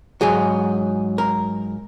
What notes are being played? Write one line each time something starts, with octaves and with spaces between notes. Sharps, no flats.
G#2 F#3 G#4
A#4